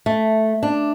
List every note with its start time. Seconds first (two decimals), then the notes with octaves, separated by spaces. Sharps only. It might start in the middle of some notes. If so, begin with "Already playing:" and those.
0.06 A3
0.63 D4